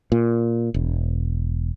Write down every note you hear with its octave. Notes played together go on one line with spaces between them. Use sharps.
A#2
E1